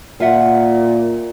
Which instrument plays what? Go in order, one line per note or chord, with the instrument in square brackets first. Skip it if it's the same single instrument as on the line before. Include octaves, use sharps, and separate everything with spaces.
[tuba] A#2 [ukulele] F4 E5 F#5